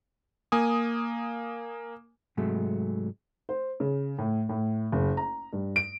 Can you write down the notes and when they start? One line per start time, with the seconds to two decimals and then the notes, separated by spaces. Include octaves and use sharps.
0.52 A#3 G#5 D#6
2.37 G#2 C3 F#3 G#3 A3
3.49 C5
3.80 C#3
4.18 A2
4.49 A2
4.92 F#1
5.17 A#5
5.53 G2
5.76 D7